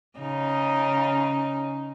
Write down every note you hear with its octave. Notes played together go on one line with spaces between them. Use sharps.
C#3 D#4